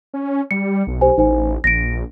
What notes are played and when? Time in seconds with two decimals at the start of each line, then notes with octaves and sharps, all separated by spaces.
0.14 C#4
0.51 G3 C#7
0.87 B1
1.01 G4 C5 G#5
1.18 A1 D#4 C5 G#5
1.64 A#1 A#6 D7